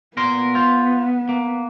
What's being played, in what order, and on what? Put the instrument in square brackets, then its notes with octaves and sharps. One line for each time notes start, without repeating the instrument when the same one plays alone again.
[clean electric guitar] A#2 A#4 C6 [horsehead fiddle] B3
[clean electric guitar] F4 C5
A#3